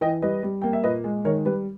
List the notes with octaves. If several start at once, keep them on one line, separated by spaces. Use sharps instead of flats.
E3 D#5 G5
G3 B4 D#5
G3
A#3 G5
E5
A#2 B4 D#5
G#3
D#3 A#4 C#5
G3 B4